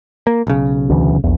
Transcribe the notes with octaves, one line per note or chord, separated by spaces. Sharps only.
A#3
B1 C#3
D2 E3
A#1 E2